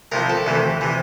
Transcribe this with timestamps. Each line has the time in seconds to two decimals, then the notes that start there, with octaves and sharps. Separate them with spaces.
0.12 C2 C3 F3 A#4
0.30 A4
0.46 D2 C3 E3
0.81 C3 E3